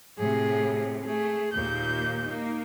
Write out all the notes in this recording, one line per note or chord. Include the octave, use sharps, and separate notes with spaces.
A2 C3 G#4
A3 G#4
D#2 A#2 A#3 G6
A#3 D#4